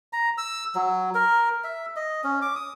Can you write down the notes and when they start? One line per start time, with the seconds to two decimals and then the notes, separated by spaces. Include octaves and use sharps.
0.13 A#5
0.38 E6
0.75 F#3
1.15 A#4
1.64 E5
1.96 D#5
2.24 C#4
2.42 D6
2.55 D#6